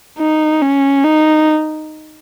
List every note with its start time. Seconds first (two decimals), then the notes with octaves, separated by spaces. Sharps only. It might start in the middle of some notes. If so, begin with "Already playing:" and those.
0.19 D#4
0.62 C#4
1.05 D#4